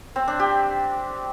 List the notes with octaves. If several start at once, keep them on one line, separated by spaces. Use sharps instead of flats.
C4
D4
G4